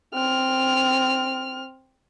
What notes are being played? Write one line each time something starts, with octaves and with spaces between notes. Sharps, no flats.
C4 F6